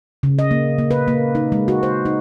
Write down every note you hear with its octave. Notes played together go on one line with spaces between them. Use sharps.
C#3
D#5
A#3
A#3
B4
A#3
D#4
G#3
F#4
C5
D#4